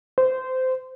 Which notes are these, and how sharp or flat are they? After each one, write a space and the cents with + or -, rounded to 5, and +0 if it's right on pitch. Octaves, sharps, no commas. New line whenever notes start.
C5 -20